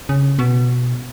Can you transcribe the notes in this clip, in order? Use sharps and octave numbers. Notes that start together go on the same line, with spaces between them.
C#3
B2